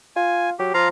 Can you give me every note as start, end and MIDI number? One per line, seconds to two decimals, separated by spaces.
0.16 0.52 65
0.16 0.50 80
0.59 0.73 54
0.59 0.73 67
0.74 0.89 53
0.74 0.89 65
0.74 0.89 77
0.74 0.89 82